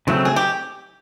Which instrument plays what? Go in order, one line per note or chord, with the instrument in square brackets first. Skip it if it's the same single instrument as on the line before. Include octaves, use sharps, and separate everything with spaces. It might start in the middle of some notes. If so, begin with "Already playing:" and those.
[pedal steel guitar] C#3 F#3 A3 C4 [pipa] E4
[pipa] G#4
G4